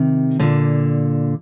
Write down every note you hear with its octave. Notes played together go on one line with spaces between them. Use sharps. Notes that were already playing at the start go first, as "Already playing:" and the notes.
Already playing: C3 D#3
A#2 D3